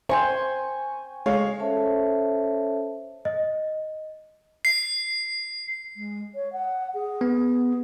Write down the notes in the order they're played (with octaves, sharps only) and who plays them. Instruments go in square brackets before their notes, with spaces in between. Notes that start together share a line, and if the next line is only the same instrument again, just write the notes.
[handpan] C5 [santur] G5 G#5 C#6
[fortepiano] G#3 C#5 F5
[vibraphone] C#4 A4 C5 C#5 E5 A5
[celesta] D#5
[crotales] C7
[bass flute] G#3
C#5
F#5
G#4
[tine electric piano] B3